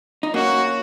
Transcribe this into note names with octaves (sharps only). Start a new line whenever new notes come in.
D#4
A#3 C#4 F#4